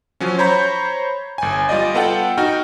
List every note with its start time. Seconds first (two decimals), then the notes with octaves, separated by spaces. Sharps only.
0.20 F3 F#3 C#4
0.38 C5 C#5 A#5 B5 G6
1.38 G1 G#5
1.69 G3 F4 D5 D#5
1.94 B3 F4 A4 F#5 G5
2.38 D#4 F#4 G5 F6